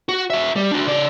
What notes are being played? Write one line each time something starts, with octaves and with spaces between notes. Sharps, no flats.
F#4
F#4 E5
G3
D4 F#4
C#3 D5